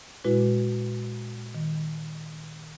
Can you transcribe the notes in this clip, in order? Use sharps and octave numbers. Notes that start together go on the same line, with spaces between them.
A#2 G#3 E4 F#4 B4
D#3